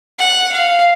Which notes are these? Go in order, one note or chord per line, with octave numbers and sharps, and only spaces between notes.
F#5
F5